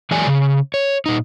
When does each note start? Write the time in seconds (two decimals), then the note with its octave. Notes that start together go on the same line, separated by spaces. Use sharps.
0.11 E3 F#3 G#3 A#3 D5 G#5
0.27 C#3
0.74 C#5
1.06 A#2 D#4